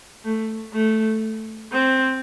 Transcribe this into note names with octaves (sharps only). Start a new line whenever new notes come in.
A3
A3
C4